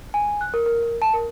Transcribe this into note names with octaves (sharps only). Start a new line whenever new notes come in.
G#5
F#6
A#4
A#4
A#4
A5
A#4